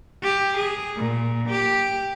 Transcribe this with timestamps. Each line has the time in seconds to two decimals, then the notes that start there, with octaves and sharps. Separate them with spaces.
0.22 G4
0.58 G#4
0.97 A#2
1.49 G4